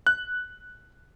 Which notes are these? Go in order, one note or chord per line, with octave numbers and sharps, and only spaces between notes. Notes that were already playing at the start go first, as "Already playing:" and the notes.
F#6